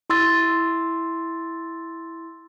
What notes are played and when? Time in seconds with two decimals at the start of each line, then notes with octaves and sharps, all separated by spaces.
0.10 E4 C6 E6 A6